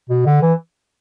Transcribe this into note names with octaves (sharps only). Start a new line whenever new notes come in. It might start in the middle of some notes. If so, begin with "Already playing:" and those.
B2
D3
E3